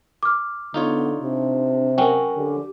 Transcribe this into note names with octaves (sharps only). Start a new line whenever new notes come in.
D6 F6
D3 B3 D#4 F4 C#5
C3 D4
F#3 C#4 F#4 A#4 G5
D3 G4